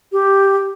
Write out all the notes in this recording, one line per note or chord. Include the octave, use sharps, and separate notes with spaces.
G4